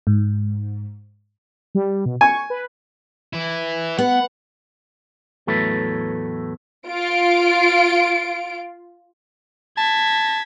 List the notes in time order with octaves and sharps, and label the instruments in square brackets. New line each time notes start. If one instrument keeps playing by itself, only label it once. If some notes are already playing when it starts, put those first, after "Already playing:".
[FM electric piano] G#2
[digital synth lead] G3
B2
[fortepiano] G#5 [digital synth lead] C#6
[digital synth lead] B4
[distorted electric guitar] E3 E4
[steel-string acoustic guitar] B3 [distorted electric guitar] F#5
[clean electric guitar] E2 A2 F#3 A3 A4 B4
[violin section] F4 D7
[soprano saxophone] A5 [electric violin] G#6 B6